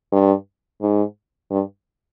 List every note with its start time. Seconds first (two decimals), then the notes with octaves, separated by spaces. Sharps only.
0.12 G2
0.82 G#2
1.51 G2